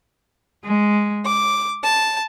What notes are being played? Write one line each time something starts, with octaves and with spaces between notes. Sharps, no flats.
G#3
D6
A5